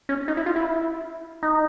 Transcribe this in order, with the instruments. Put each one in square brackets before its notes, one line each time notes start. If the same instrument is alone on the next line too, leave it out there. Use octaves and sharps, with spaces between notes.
[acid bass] C#4
D#4
E4
F4
E4
D#4